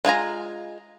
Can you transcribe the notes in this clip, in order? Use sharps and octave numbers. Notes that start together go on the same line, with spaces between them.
G#3 F4 G#5 A#5